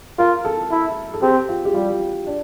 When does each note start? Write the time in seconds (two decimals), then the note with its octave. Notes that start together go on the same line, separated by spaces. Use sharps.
0.18 F4 A#4
0.45 A4
0.71 E4
1.14 A4
1.22 C4 G4
1.49 F4
1.65 G4
1.74 G3 F4
2.26 D4